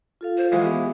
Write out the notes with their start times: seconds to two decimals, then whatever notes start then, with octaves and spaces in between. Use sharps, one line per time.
0.21 F4 A4 F5
0.37 C5
0.52 E3 G#3 F#4 F5
0.65 B3 G4